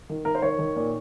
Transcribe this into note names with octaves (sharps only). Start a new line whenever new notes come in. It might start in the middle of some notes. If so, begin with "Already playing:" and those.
D#3
D#3 A#4
C5
D#3 C#5
D#3
A#2